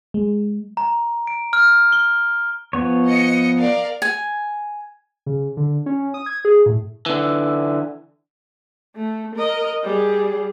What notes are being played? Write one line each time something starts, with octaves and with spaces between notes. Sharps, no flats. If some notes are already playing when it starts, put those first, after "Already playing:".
G#3
A#5
D7
F6
G7
F3 B3 C#5
D#5 C#7
A#4 D5 F5
G#5
C#3
D3
C#4
D#6
G#6
G#4
A2
D3 E3
A3
A#4 D#5
G3 G#4